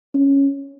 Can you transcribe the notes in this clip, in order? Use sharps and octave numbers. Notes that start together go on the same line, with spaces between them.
C#4